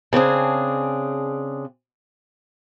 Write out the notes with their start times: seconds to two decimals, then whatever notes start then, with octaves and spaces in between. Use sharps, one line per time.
0.13 C#3 C4 D4 G#4